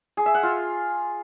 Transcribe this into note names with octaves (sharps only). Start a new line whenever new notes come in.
G#4
E5
F#5
F4